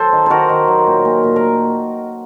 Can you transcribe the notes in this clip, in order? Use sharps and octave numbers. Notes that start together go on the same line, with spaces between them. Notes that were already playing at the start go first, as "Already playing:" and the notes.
Already playing: F#3 A4 C5
D#3
D#3 F#4 A#4 C5
D#3
F#3
A#2
A#2
A#2
A#4